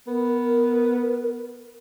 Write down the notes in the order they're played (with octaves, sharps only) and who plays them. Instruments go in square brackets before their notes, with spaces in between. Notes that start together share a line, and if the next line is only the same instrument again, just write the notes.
[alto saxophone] B3 [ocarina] A#4